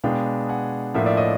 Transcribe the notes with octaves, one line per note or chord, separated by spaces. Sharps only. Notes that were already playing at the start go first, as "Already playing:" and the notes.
B2 G#3 B3 D4 F5 G5
F#5 G#5
A2 F3 A#3 D4 E5 F#5
D5 E5
C#5 D#5